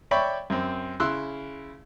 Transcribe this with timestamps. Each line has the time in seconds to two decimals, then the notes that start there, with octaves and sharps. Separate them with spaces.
0.11 C#5 D5 E5 G5 B5 C#6
0.50 F#2 C4
1.00 C#3 E4 C6 E6 F#6